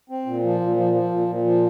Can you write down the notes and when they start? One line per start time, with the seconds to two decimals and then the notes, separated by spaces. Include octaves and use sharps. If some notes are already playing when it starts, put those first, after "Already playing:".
0.10 C4
0.26 A#2
0.43 F3
0.60 A#2
0.76 F3
0.94 F3
1.11 A#2
1.28 A#2
1.45 F3